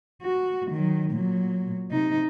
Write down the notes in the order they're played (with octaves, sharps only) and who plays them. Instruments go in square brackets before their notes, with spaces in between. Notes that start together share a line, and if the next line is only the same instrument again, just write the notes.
[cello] F#4
D#3 F#3
A#2 F#3
C3 D#4